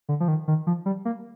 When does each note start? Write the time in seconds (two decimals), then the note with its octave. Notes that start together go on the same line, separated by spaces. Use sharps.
0.09 D3
0.20 F3
0.28 D#3
0.48 D#3
0.67 F3
0.86 G3
1.05 A#3